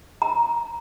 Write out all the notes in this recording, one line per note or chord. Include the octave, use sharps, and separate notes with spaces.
A#5